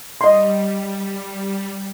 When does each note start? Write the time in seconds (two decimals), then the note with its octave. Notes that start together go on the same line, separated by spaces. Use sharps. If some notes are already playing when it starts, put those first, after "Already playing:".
0.21 G3 D#5 C6